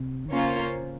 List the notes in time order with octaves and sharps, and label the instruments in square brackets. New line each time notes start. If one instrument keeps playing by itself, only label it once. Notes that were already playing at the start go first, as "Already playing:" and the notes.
Already playing: [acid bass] C3
D#3
[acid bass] C#3 [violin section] A#3 C#4 F4 C5